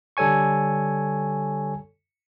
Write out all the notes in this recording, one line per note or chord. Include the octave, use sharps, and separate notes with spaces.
D3 G3 A4 C#5 G#5 C#6